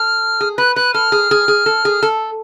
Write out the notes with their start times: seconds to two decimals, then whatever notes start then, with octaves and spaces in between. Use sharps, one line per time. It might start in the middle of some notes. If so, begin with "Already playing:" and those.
Already playing: A4 F6
0.41 G#4
0.58 B4 F#6
0.76 B4 F#6
0.94 A4 F6
1.12 G#4
1.31 G#4
1.48 G#4
1.66 A4
1.85 G#4
2.03 A4